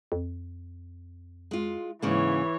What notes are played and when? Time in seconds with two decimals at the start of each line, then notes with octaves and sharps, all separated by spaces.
0.12 F2
1.51 G#3 F4
2.02 G#2 C#3 E3 A#3 C#5